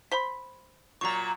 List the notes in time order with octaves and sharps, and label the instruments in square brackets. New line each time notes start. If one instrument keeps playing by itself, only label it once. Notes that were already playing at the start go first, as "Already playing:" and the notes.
[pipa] C5 B5 [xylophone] C6 B6
[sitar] A#2 F#3 [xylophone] A#5 C#6